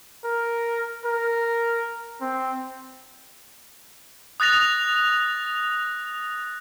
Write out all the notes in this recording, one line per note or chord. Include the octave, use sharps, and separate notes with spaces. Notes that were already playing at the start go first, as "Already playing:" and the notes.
A#4
A#4
C4
D#6 F#6 A6 A#6 F7